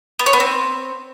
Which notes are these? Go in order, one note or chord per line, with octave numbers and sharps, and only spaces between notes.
B3
C#5
B3
C4